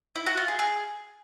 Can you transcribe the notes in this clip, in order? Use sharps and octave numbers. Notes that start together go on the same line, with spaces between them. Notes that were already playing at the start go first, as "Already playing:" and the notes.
E4
F#4
F4
G#4
G#4